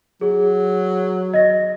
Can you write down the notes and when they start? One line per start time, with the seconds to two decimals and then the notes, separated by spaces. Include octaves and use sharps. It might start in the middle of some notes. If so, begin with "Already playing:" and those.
0.21 F#3 G#4
1.34 D#5 A#6